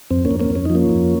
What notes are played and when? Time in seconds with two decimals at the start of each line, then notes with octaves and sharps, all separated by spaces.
0.11 F2 C4
0.25 A#3 C#4
0.31 F2
0.40 A#3 C#4
0.50 F2
0.55 C#4
0.65 F3 D#4
0.75 A#3 C#4
0.89 F2